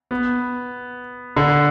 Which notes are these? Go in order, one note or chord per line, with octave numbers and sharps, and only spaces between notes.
B3
D3